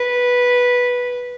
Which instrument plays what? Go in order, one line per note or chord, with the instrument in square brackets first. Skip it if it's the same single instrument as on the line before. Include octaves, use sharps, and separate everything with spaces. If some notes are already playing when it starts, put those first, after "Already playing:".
Already playing: [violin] B4